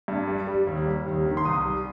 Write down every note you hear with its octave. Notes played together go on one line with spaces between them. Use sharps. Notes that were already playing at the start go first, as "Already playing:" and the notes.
G2
G3
G3
D#2
G3
D#2
D#3
C6
C2 D#6
G3